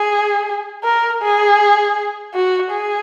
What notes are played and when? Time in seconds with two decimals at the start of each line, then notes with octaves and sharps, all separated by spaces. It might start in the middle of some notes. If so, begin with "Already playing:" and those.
Already playing: G#4
0.85 A#4
1.23 G#4
2.34 F#4
2.71 G#4